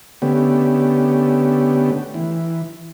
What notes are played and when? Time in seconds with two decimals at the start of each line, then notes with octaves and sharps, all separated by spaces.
0.22 D3 A3 B3 C#4 G4
2.14 E3